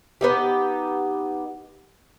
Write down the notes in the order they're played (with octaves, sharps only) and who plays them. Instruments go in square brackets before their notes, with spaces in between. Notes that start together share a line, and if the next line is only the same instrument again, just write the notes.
[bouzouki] B3 D#4 G4